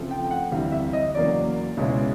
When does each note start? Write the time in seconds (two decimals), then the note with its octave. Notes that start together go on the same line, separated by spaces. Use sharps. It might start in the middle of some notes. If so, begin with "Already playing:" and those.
Already playing: C#3 F3 A3 C4
0.11 G5
0.24 G5
0.31 F#5
0.51 D2 C3 E3 G3 F5
0.72 E5
0.93 D#5
1.14 E2 C#3 F#3 A#3 D5
1.77 C#2 B2 G#3 C#4 E4